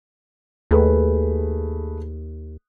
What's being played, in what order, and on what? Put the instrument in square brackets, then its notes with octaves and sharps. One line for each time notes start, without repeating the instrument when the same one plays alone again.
[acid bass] D#2 [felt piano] A3 G#4 B4